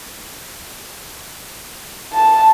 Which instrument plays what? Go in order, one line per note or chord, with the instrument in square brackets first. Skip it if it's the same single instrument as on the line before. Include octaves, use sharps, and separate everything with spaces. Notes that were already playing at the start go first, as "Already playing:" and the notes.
[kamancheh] A5